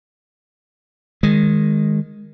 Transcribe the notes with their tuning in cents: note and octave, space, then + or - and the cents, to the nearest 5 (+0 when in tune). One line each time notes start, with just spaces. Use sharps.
D#3 +0 G#3 -5